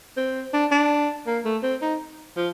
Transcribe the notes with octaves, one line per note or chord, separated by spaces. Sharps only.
C4
D4
D4
A#3
A3
C4
D#4
F3